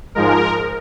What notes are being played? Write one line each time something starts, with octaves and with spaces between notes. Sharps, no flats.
G#2 F3 G#3 A#4